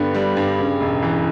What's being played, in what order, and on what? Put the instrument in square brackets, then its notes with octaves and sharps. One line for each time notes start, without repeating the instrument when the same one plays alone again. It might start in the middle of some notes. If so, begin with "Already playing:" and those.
Already playing: [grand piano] G2 D3 G3 B3
G3
G2
C#3
E1
E3